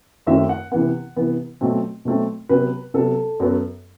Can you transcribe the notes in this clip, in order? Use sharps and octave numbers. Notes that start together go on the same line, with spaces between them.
F#2 D#3 F#3 A3 C4 E5
F#5
C3 E3 B3 F#5
C3 E3 B3
B2 F#3 A3 C4
B2 F#3 A3 C4
C3 F#3 B3 B4
C3 F#3 B3 A4
F#2 F#3 B3